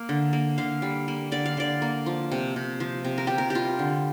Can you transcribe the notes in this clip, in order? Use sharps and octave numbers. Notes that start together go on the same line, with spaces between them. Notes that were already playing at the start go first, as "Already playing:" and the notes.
Already playing: A#3
D3
A#3
D3 F5
G3
A#3
D3 D5
F5
D3 D5
A#3
F3
C3
C3
F3
C3
A#4
C3 G4
A#4
G3 F4 G4
D3